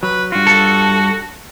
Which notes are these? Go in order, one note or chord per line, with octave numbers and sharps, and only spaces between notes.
F#3 B4
G2 F4 F#4
A4